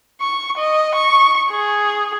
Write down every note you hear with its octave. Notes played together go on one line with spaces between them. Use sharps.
C#6
D#5
C#6
G#4